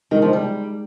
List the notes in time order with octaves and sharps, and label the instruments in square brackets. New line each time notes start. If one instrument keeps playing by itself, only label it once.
[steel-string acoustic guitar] D#3 [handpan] G#3 D#4 G4
[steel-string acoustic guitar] F3
G3